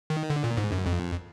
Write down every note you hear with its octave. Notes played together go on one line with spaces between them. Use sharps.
D#3
D3
A#2
G#2
F#2
F2